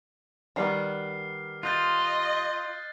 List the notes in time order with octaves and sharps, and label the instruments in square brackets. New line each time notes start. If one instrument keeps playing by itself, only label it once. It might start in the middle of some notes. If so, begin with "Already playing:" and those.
[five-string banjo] D#3 G3 B3 [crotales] F6 C7
[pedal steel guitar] F4 [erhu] D#5 [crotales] F#6 G6 A6